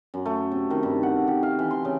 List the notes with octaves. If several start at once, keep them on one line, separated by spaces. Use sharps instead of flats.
F#2
A3
C3
D#3
G2
F#5
G4
F5
E3
C6
C#3